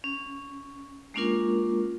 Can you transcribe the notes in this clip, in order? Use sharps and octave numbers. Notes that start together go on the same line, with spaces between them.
C#4
G#3 A#3 C#4 D4 F4 A#4